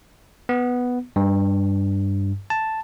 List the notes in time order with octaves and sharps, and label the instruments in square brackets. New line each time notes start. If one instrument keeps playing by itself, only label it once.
[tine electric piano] B3
G2
A5